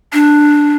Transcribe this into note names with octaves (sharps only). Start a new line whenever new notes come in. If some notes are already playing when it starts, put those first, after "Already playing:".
D4